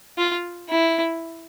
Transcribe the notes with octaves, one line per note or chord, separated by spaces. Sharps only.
F4
E4